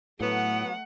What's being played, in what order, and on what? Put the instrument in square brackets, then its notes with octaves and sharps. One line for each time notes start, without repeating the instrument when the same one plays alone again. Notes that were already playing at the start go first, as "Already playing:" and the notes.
[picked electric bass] A2 [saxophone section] F#3 B3 [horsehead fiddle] A3 F#5